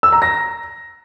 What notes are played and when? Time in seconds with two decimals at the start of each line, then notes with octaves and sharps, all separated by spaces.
0.03 E6
0.12 A#5
0.22 A#6